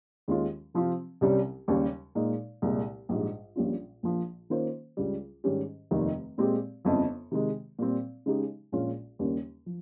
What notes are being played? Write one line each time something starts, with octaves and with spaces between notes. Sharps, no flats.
D#2 D#3 G#3 C#4 F4
C3 F3 C4 F4
C2 C3 G3 C#4
D#2 C#3 G3
A#2 G#3 D#4
C2 A#2 G#3
A#1 G#2 G3
A#1 A#2 G3 C#4 F4
A#1 A#2 F3 A#3
D#3 A#3 C#4 F4 C5
C#2 C#3 G3
G#2 D#3 G3 C#4 G4
F1 D#2 D#3 G3
A#2 G#3 C4 G4
G1 F2 C#3
C3 D#3 G#3
A#2 G3 C4
C#3 G#3 D#4 G4
A#1 A#2 G#3 C#4 F4
D#2 C#3 G3 A#3 C#4
F3